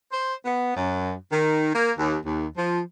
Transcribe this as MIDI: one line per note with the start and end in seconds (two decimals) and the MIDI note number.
0.12 0.33 72
0.45 0.73 59
0.76 1.13 42
1.31 1.74 51
1.75 1.92 58
1.98 2.17 39
2.26 2.45 39
2.57 2.81 53